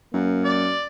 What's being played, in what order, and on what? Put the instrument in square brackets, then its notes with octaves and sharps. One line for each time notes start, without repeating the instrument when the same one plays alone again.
[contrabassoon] F#2 [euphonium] A#3
[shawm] D5